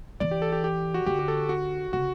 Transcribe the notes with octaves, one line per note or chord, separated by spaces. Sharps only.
E3 D5
G4
A4
G4
G4
F#4
D3 G4
G4
A4
F#4
C#3 F#4